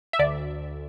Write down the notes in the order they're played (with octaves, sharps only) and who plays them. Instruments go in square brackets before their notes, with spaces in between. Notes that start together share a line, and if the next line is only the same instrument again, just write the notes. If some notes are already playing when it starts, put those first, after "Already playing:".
[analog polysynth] E5
D2 D5